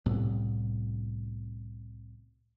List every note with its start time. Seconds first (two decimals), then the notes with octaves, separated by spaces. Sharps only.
0.06 C2 A2 C3 B3